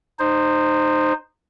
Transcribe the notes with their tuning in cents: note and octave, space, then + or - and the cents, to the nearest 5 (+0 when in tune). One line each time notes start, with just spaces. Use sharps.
D#4 -25 C5 +0